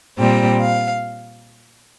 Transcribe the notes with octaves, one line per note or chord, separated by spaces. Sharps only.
A#2 G3 C4 G5
F5